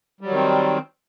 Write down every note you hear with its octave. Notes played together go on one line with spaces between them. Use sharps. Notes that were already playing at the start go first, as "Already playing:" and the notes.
D#3 F#3 G3 C4